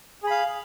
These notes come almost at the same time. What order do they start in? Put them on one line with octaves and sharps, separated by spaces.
G#4 B5 F5